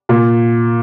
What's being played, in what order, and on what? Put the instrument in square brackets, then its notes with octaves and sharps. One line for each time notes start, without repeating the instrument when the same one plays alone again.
[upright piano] A#2